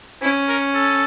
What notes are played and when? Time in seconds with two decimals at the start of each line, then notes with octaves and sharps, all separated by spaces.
0.22 C#4 E4
0.49 A#4
0.75 A4